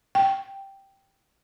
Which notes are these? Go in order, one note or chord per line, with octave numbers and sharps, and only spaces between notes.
G5